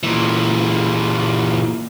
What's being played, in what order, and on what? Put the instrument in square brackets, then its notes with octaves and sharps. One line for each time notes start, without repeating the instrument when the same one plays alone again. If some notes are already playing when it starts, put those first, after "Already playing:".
[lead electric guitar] A#2 E3